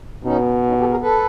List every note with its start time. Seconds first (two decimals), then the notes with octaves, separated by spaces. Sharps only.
0.24 B2 C#4 D#4
0.68 C#4 D#4
0.80 G4 A4
0.91 G#4 A#4
1.02 A4 B4